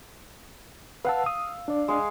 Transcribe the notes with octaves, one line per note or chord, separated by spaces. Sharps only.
B4 F5 F#5 A5 E6
D#6
D4 D5
G#3 F5